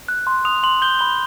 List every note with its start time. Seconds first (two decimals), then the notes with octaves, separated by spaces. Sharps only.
0.08 F#6
0.27 C6
0.45 D#6 F7
0.63 C6 F#7
0.82 G6 G7
0.99 B5 G7